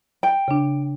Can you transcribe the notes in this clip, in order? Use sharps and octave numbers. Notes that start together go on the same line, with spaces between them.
G5
C#3 D4